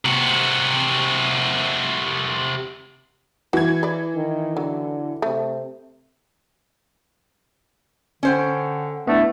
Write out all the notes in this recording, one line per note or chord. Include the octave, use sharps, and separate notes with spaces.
C3 F#4
E3 F#4 G#6
B4 D5
D#3
D3 F#3
C3 A3
D3 C#4 C5 G5
A3 B3 D4 E4